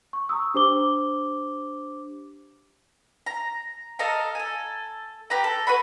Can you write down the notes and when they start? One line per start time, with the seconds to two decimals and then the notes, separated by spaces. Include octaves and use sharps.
0.13 C#6
0.29 A#5 C#6 D#6 E6
0.54 D4 G4 C5 D6 G7
3.26 A#5
3.99 A4 D#5 F5 A#5
4.35 A4 G#5
5.30 G4 B4 A#5
5.44 A4
5.67 B4 C#5 F#5 B5